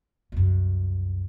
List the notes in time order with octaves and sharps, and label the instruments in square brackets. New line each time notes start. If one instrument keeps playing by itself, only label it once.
[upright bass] C2 F#2